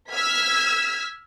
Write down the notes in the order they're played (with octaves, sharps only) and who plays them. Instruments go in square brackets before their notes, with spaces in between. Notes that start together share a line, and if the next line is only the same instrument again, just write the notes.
[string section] E6 F6 G#6 B6